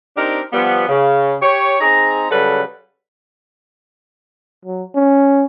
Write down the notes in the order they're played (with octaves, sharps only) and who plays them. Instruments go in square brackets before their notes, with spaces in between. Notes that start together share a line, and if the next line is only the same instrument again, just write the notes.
[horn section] C4 D4 D#4 G4 A#4
F3 G3 B3
C#3
G4 C#5
C4 D#4 G#4 A#5
C#3 F#3 G3 A4 B4
[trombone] F#3
C#4